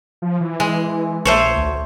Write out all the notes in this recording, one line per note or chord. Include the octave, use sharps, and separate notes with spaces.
F3
E3
G#3
A#1 A3 C5 C#5
D2